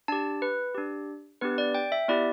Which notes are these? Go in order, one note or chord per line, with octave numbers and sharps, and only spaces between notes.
D4 G4 A5
B4
D4 G4
B3 D4 G4 B4
D5
G5
E5
B3 E4 G4 D5